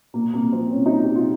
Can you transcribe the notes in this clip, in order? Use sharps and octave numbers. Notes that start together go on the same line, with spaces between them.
A#2 A#3
C2 A#3
F3 C4
C2 C#4
D#4
A#2
G4
C2
F4